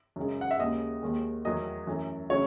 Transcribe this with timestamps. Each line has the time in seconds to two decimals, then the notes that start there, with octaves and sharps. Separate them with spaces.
0.16 F#2 C#3 G#3
0.41 F#5
0.51 E5
0.59 D#2 C#3 G#3 D#5
1.02 D#2 D#3 G#3
1.45 E2 D#3 F#3 A3 D#5
1.87 F#2 E3 A3
2.30 C#3 F#3 A3 C#5